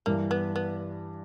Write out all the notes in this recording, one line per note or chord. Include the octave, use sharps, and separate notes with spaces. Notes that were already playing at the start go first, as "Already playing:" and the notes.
G2 E3 G3 A#3
B3
B3